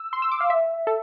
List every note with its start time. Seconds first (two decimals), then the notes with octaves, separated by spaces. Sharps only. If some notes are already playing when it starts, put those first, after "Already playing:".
Already playing: E6
0.13 C6
0.22 E6
0.32 D6
0.40 F5
0.50 E5
0.87 A4